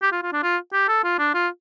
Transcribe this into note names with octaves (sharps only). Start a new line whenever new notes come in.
G4
F4
F4
D4
F4
G4
A4
F4
D4
F4